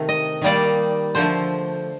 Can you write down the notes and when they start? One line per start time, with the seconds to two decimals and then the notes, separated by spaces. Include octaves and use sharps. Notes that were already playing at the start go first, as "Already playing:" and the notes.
Already playing: C3 D#3 A3
0.09 D#5
0.41 D#3 G3 A#3 D#4 D5
1.15 D3 F3 A3 C5